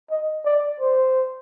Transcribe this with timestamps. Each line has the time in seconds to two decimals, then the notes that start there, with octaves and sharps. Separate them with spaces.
0.11 D#5
0.45 D5
0.80 C5